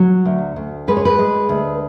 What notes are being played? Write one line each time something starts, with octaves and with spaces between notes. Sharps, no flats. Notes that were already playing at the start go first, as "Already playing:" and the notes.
Already playing: F#3
D2
D2
G#3 B4
C#5
B4
G#3
D2